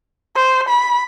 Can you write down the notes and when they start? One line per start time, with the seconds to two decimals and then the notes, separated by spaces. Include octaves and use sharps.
0.35 C5
0.68 B5